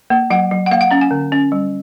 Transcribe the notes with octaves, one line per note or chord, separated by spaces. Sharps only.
A#3
F#3 F#5
F#3
F#5
A#3 F5
F#5
C#4 A#5
G#5
D3
C#4
G3